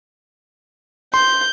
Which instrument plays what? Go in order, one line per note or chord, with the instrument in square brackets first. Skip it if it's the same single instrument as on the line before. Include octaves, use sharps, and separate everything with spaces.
[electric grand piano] C6 [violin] G6